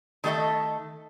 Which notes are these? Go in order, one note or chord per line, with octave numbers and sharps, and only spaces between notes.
D#3 A3 A4 D#5 E5